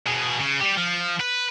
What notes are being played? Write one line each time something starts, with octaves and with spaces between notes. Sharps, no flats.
B2 G#4
C#3
G3 G4
F3
B4